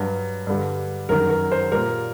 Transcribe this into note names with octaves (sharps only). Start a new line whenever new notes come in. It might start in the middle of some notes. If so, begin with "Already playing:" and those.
Already playing: G2 F#3
G2 D3 G3
F#2 D#3 F#3 A#4
A#4
C5
A#2 G3 A#4